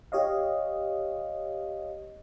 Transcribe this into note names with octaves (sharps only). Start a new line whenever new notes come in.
G4 C#5 D#5 F5